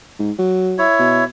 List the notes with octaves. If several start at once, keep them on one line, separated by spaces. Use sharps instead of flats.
G#2
F#3
E4 C#5
B2